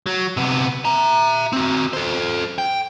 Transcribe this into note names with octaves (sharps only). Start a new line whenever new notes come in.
F#3
C3 B3
E5 A#5
C4 F#4
A4 C5
G5